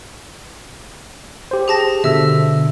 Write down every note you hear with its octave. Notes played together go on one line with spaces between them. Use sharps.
G4 C5
G#4 A5 A#6
B2 D3 E5 E6